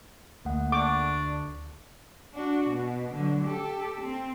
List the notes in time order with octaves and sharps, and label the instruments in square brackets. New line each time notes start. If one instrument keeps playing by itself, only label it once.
[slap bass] D2 [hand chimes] A3 A#3 F#5
[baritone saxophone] D4 [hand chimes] A4 C#6 [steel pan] D6
[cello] D4 F#4
B2
D3 F#3
G4 A4
C4